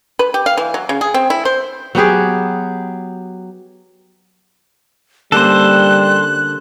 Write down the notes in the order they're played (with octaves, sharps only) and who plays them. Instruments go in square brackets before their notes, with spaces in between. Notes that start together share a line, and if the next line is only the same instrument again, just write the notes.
[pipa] B4
G4
F5
E3
F#3
C#3
G#4
C4
E4
C5
[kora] F#3 B3 G4 G#4
[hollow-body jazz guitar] D3 A#3 C#4 [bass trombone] G3 [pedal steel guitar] A4 C5 [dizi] F#6